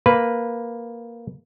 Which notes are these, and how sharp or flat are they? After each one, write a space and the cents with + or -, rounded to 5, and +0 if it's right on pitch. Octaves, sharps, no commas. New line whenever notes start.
A#3 +0 B4 +0